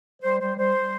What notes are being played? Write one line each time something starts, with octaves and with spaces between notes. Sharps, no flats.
G3 C5
G3 C5
G3 C5
G3